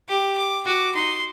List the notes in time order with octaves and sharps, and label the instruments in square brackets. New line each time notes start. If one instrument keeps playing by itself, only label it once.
[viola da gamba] G4 [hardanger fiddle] D6
[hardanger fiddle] D6
[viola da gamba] F#4 [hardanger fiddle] D6
[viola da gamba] D#4 [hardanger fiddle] C6